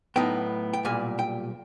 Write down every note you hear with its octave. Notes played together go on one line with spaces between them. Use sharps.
A2 F#3 B3 D#4 G5
G5
B1 A#2 G3 G#5
G5